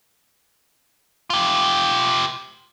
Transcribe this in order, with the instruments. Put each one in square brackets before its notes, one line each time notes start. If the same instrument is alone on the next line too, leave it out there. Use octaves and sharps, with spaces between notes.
[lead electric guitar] F4 G4